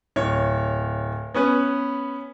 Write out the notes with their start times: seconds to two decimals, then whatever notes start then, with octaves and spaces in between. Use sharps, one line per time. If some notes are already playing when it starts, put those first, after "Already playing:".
0.16 D1 C#5
1.34 B3 C#4 B4